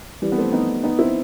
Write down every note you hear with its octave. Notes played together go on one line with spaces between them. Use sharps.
E3 G3
B3
A3 C4
B3 D#4
B3 D#4
C4 E4